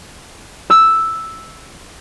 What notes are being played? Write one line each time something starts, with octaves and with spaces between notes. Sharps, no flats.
E6